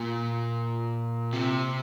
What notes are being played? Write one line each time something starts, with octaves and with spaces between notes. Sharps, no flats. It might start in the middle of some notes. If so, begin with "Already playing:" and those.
Already playing: A#2
C3